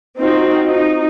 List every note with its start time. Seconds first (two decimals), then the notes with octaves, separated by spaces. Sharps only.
0.18 C4 D#4 F4 F#4
0.67 D#4